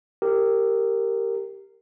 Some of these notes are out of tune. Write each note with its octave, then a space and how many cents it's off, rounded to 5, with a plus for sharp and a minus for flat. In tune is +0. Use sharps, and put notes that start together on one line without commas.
G4 +0 A#4 -15